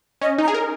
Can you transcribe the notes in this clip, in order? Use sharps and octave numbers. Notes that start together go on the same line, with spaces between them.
C#4 D#5
D#4 A#5
G#4
A#4